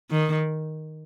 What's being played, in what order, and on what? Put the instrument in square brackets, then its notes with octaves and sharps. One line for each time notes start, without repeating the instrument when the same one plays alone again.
[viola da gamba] D#3